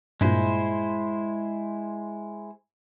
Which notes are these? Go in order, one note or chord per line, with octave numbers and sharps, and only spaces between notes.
G2 A#2 G#3 E4 C5